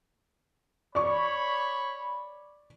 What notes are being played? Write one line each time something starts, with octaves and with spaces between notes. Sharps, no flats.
C#5 D5 B5 C#6